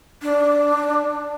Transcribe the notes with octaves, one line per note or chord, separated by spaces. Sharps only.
D4